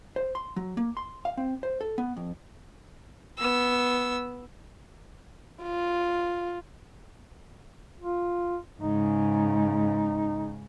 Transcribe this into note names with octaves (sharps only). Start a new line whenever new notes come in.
C5
C6
F#3
A#3
C6
F5
C4
C5
A4
B3
F2
B3 E6
F4
F4
G#2 C#3 D#4